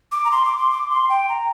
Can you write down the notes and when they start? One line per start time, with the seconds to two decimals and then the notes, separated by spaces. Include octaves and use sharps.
0.12 D6
0.25 A#5
0.31 C6
0.45 D6
0.58 C6
0.71 D6
0.90 C6
1.09 G5
1.29 A#5